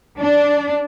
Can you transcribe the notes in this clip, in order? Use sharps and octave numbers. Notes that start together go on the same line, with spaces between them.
D4